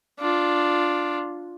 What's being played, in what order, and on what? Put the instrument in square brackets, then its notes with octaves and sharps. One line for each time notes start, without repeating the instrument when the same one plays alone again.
[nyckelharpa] D4 F4